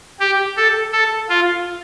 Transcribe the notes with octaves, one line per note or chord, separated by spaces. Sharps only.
G4
A4
A4
F4